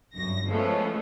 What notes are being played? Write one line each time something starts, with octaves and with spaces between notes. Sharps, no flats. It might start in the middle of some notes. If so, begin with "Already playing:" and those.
G1 F#2 A#6
F3 G#3 A3 B3 C#4